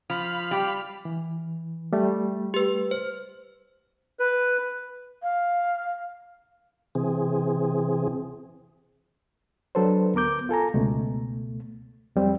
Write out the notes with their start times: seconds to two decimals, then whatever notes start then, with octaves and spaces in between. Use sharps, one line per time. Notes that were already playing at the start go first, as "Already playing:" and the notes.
0.10 F3 F5 B5
0.51 G3 G4
1.05 E3
1.93 G3 A3
2.54 G4 B4
2.91 C5
4.19 B4
5.23 F5
6.95 C3 E3 C4 G#4
9.75 F#3 D4 A4 B4 C5
10.14 D2 B3 A#4 D6 G6
10.49 F4 A4 G#5 A#5
10.74 C#2 B2 A3
12.16 F2 G3 C4